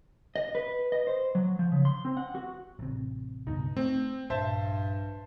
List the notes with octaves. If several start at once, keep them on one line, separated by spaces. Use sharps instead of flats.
D#5
B4
D#5
C5
F#3
F3
C#3
C6
C4
F#5
F#4
A1 C3
C#2 G2 B2 D#4
A3 C4
A#1 G2 C5 E5 A5